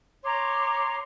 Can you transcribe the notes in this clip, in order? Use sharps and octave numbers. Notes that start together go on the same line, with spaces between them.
C#5 A#5 C6 D6